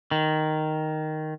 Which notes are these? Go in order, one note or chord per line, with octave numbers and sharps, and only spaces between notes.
D#3